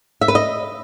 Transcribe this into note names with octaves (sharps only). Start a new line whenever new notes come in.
E5
B4
D#5